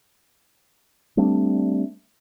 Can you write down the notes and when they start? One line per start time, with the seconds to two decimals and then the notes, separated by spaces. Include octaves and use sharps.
1.17 G3 A3 C4 D4